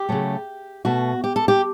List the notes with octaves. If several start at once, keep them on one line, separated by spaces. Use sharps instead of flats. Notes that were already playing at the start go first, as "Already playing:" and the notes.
Already playing: G4
C#3 F#3 A3
B2 A3 F#4
G4
A4
G4